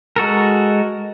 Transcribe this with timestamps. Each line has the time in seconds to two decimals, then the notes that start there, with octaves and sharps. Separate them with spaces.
0.16 G#3 F#4 A4 A#4